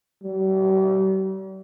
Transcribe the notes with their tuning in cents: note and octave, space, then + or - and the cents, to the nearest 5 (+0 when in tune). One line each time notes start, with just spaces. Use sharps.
G3 -45